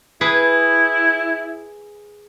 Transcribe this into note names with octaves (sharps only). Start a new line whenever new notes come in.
E4 G#4 B4